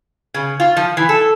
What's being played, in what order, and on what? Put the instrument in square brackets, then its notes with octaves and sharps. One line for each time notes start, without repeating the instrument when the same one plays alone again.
[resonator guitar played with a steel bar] C#3
F4
F3
E3
A4